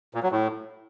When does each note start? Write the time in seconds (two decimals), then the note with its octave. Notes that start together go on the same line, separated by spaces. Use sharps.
0.14 A#2
0.23 F#3
0.32 A2